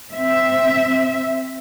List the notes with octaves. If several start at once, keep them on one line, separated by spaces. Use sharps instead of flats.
C4 E5